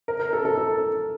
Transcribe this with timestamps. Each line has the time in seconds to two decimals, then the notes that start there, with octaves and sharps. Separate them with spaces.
0.08 A#4
0.20 A#4
0.33 A4
0.45 A4
0.58 A4